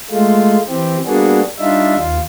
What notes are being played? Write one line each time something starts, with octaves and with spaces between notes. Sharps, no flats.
G#3 A3 F4
E3 C4 G4
G3 A#3 B3 D4 F#4 G#4
G3 D4 D#4 F4 E5
D#2 F4